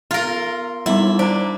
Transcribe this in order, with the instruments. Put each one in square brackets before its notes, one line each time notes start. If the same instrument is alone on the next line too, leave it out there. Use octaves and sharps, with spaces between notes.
[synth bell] B3 [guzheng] F4 A#4
[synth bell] G3 B3 D#4 [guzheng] E4
[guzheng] D4 [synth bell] C5 A#5